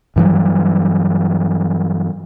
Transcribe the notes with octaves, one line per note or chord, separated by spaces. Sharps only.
G2 E3 F#3 G3